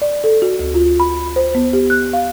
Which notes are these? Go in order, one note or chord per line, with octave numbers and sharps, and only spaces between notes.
D5
A4
F#4
D2
F4
B5
C5
B3
G4
F#6
F5